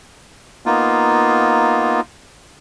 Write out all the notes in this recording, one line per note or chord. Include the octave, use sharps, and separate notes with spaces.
A#3 B3 D#4 F4